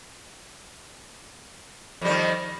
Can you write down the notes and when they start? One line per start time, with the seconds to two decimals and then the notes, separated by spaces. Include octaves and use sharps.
2.02 F2
2.05 G3
2.09 D#3